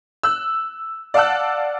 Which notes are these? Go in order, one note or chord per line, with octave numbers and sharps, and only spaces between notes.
E6 F#6
D5 F5 F#5 A5 E6 F#6